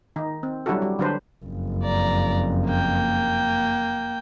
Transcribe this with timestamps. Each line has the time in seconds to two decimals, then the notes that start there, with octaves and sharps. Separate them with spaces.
0.16 D#3 D#4
0.43 C4
0.66 F#3 G3 D4 E4 F#4 A4
0.82 G3
0.99 D3 F#3 D4 B4 C5
1.44 F#1 F2
1.84 D5 A#5
2.67 A#3 G5